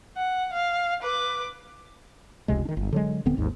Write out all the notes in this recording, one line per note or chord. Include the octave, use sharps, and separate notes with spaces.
F#5
F5
B4 D6
F1 C#2 C3 G#3
D#3 D4
G1
D3 F#3 G#3
D#1 D3 B3 C4
G#1 D#2 G#2